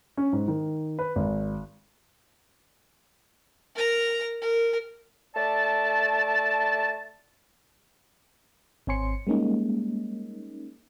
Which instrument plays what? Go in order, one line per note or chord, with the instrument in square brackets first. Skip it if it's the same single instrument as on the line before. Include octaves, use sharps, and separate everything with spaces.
[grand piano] C#4
G#2
D#3
B4
G#1
[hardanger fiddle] A#4 A#5
A#4
[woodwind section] A3 D5 A5
[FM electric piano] G#1 C4 C#5 G#5 C6 C#7
G3 G#3 A#3 C#4 D#4